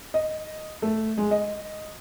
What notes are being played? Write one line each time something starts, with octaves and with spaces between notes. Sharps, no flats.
D#5
A3
G#3
D#5